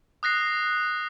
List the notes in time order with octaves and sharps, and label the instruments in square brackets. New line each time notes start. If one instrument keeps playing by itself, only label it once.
[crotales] D#6 F#6 A#6 C7